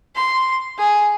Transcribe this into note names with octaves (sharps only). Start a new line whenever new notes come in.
C6
G#4